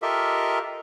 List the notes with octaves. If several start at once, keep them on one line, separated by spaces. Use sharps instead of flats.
F4 G4 A4 A#4 D#5 E5